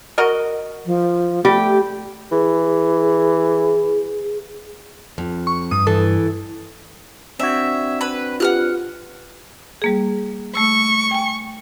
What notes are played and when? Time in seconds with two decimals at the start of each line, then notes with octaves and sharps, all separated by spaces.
0.18 F#4 A#4 D#5
0.86 F3
1.45 G3 A3 G4
2.32 E3 G#4
5.18 F2
5.47 C#6
5.71 G2 D#6
5.87 E3 A4
7.39 C4 D4 F#4 E5 G#6 B6 E7
8.01 B4 B5
8.40 F4 G4 B4 F#5 F6 F#6
9.82 G3 A#3 G#4
10.55 A3 C#6 E6
11.11 G5 G#5